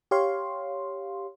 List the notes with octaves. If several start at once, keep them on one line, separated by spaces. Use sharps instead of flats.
G4 C#5 F5 C6